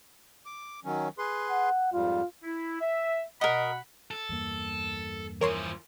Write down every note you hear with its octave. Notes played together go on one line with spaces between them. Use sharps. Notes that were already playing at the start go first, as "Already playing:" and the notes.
D6
D#3 F#3 C#4
G#4 B4 C6
F#5
F2 G#2 G3 F4
E4
E5
B2 A#4 D#5 F#5 B5
A4
E2 G2 A#3
E3 F3 A#4 C#5 C6